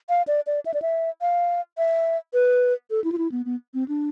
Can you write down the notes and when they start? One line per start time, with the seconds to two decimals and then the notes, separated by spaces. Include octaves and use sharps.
0.09 F5
0.27 D5
0.47 D5
0.66 E5
0.74 D5
0.82 E5
1.21 F5
1.78 E5
2.34 B4
2.90 A4
3.04 E4
3.12 F4
3.18 E4
3.32 B3
3.46 B3
3.74 C4
3.88 D4